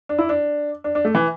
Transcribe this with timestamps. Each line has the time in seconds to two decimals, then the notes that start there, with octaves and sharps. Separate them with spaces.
0.09 D4
0.18 E4
0.29 D4
0.84 D4
0.95 D4
1.05 A3
1.15 E3